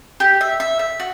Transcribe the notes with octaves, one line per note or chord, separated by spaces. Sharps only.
G4
E5
E5
E5
F#4